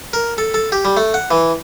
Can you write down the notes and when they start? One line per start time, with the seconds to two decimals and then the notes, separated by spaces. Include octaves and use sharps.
0.13 A#4
0.38 A4
0.54 A4
0.72 G4
0.85 G3
0.97 A3
1.14 F#5
1.31 E3